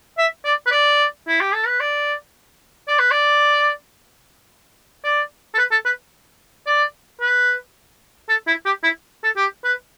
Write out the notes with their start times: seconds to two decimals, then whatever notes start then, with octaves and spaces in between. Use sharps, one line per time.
0.18 E5
0.45 D5
0.66 B4
0.72 D5
1.28 E4
1.41 G4
1.54 A4
1.67 B4
1.80 D5
2.88 D5
2.99 B4
3.11 D5
5.04 D5
5.54 A4
5.58 B4
5.72 A4
5.85 B4
6.67 D5
7.21 B4
8.29 A4
8.47 E4
8.65 G4
8.84 E4
9.24 A4
9.37 G4
9.64 B4